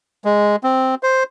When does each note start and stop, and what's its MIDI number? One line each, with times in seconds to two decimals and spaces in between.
0.25 0.56 56
0.63 0.95 60
1.03 1.24 72